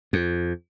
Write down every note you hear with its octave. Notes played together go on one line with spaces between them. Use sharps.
F2